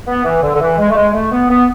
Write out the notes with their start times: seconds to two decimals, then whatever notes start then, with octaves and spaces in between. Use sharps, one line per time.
0.07 B3
0.24 E3
0.42 D3
0.54 D3
0.61 E3
0.78 G#3
0.90 A3
0.96 G#3
1.14 A3
1.31 B3
1.49 B3